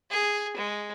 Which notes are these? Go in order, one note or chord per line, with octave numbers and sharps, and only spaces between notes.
G#4
G#3